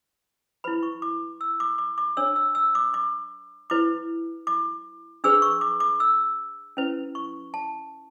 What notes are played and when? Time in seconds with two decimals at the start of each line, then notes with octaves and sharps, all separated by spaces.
0.64 E4 B4 B5
0.83 C#6
1.02 D6
1.41 E6
1.60 D6
1.78 D6
1.98 D6
2.17 D4 A4 C#5 E6
2.36 E6
2.55 E6
2.75 D6
2.94 D6
3.70 E4 B4 D6
4.47 D6
5.24 D4 G#4 B4 E6
5.42 C#6
5.61 D6
5.80 D6
6.00 E6
6.77 C#4 E4 B4
7.15 C#6
7.54 A5